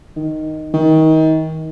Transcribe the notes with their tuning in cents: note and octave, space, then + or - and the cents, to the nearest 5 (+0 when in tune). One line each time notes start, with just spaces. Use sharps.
D#3 +0
D#3 +30